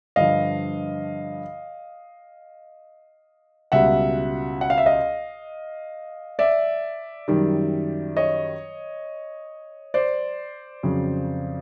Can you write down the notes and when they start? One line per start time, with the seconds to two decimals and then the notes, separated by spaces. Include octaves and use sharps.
0.16 G2 D3 F3 D#5 F5
3.72 C#2 B2 G3 E5 F#5
4.61 F#5
4.70 F5
4.78 E5
4.86 D#5 F5
6.39 D5 E5
7.28 F#2 D#3 G3
8.17 C#5 D#5
9.94 C5 D5
10.83 F2 C#3 F#3